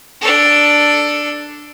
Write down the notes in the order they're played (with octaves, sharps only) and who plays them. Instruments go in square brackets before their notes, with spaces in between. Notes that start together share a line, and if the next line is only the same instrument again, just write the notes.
[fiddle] D4 A4